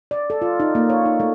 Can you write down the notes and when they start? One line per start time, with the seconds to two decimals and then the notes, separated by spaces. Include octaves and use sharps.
0.11 D5
0.30 A4
0.42 F4
0.60 D#4
0.75 A#3
0.90 C#5
1.05 D#4
1.20 A3